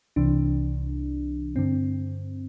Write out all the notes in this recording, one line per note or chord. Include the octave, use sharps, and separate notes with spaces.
C2 C3 E3 D4
G2 D3 C4